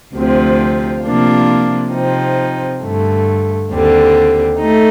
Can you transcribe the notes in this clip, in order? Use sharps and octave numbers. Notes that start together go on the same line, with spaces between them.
D2 C3 F3 C4
C3 F3 A#3 D4 F4
C3 F3 C4 D#4
G2 D3 A3
D#2 D3 G3 C4
A3 D#4